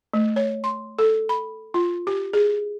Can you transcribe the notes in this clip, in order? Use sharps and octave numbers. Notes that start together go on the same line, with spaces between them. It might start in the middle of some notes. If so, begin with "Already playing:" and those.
A3
C#5
C6
A4
B5
F4
G4
G#4